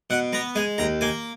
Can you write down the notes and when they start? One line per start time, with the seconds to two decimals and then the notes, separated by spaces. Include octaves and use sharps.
0.10 B2 F#5
0.33 B3 A#5
0.55 G#3 G#5
0.78 D#2 A#5
1.01 A#3 G#5